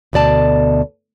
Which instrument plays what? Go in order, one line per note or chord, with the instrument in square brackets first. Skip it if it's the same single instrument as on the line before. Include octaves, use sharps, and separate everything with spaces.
[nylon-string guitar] D2 B2 D5 A5